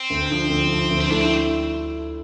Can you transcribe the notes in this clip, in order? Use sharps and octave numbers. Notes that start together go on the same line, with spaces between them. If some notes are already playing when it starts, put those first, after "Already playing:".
Already playing: C4
D2
D3 F3
D2
D3 F3
D2
C4
D3 A3 D4 E4
C4